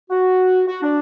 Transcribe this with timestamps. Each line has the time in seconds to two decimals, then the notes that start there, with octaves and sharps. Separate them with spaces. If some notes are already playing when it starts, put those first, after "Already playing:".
0.11 F#4
0.68 F#4
0.83 D4